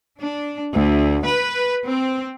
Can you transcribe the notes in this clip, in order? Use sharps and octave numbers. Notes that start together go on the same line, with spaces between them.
D4
D2
B4
C4